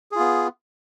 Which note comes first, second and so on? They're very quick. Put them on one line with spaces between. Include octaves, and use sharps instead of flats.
G#4 F4 B3